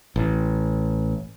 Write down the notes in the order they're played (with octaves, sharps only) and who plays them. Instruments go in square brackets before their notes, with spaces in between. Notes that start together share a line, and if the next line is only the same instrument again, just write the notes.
[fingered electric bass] A1